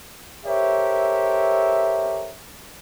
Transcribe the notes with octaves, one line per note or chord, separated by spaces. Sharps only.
G4 A4 A#4 C5 C#5 E5